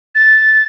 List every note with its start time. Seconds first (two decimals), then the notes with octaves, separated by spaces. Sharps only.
0.15 A6